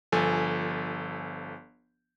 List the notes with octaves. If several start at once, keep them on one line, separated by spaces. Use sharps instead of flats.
G1 F3 A4 G#5